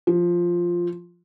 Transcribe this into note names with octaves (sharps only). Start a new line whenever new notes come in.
F3